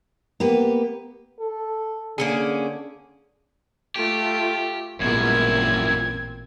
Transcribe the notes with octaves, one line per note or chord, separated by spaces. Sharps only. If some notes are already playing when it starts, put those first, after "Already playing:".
A#3 B3 G4 B4
A4
D3 A#3 C#4 G#4
A3 F4 G4
A1 F#2 A#2 G3 G#3 B3 E4 G#6
C4